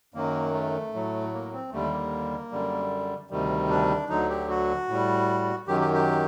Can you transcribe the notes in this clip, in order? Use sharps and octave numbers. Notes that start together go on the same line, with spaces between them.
F#2 D#3 F#3 A#3
A3
A2 F#3
A#3
C4
D#2 D3 G3 A3
A#3
F#2 D3 G3
D2 C3 D#3 G3
D4
D2 D3 F#3 D#4
G4
F#4
A2 G3
F#2 D#3 F#3 G4
G4
G4